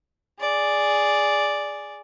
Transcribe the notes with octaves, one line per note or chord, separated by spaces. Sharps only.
G#4 D5